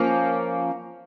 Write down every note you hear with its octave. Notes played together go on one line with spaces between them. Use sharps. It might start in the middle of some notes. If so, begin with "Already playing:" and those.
Already playing: F3 A#3 C#4